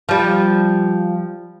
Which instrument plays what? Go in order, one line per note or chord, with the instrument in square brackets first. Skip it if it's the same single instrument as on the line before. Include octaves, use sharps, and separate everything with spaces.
[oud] F3 G3